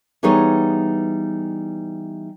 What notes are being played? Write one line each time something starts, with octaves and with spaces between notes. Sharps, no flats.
E3 G3 B3 D#4 G#4 C#5